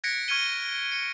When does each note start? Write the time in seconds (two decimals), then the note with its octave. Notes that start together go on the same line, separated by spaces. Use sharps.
0.04 F#6 G#6 A#6 B6 C#7 D7
0.28 C#6 F6 G#6 C#7 D#7 G7
0.92 C#7 D7